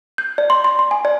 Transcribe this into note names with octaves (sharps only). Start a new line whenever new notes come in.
G6
D5
C6
C6
C6
G#5
D5